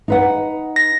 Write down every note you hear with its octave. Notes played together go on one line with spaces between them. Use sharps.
D#4 B4 F#5
A#6